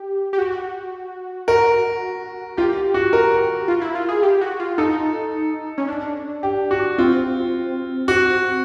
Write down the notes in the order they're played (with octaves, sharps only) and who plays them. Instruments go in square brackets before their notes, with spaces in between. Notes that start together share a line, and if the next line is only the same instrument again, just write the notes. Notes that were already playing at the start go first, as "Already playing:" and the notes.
Already playing: [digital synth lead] G4
G4
F#4
[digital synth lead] F#4 [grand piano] A#4
[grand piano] F4 [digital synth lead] G4
[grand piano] F#4
A#4
[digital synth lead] F4
E4
F4
G#4
G4
F#4
F4
[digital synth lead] D#4 [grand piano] A4
[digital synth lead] C#4
D4
[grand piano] G4
F#4
[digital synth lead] C4 [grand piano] F4
[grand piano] F#4